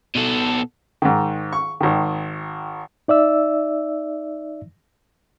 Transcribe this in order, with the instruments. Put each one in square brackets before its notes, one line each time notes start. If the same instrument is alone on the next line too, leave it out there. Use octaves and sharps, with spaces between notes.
[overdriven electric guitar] B2 A4
[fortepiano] G#2 D#3
C#6
G#1 D#3
[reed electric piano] D#4 D5 E5 E6